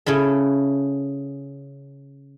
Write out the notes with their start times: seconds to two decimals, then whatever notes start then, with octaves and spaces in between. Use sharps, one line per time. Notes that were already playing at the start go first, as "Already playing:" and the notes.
0.06 C#3 C#4 E4 A4